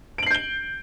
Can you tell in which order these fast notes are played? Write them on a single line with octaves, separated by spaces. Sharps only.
D7 F#7 C7 G6 G7